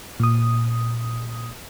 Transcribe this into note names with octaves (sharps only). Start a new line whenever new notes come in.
A#2 D#6